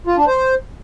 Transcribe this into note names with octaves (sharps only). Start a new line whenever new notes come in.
F4
D4
C5